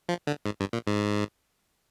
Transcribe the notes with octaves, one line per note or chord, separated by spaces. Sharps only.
F3
D3
G#2
G2
A#2
G#2